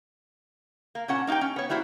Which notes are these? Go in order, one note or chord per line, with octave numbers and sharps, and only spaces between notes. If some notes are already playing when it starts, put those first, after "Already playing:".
A#3
A#2 C#4 F#5 A5
A#3 D#4 E4 G4 G5
C#4
B3 C#5
G3 A#3 E4 F#4 C5